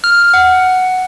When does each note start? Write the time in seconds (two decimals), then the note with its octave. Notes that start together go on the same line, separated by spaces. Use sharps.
0.04 F6
0.34 F#5